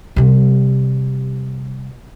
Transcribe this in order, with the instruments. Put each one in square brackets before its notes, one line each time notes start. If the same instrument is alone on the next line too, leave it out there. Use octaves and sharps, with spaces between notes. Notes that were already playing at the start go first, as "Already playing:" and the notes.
[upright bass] C3 G3